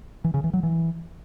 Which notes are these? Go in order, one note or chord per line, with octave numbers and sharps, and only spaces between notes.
E3
C#3
E3
F#3
E3